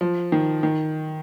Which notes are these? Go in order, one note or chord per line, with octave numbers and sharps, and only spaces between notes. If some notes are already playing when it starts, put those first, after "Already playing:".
F3
D#3
D#3